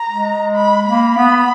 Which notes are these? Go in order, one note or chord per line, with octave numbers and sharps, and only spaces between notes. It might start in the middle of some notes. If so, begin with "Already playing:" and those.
Already playing: A#5
G#3
B5
A#3 B5
B3 B5